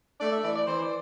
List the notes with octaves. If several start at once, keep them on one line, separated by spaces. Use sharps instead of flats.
A3 D5
E5
E3 D5
D5
E3 C5
D5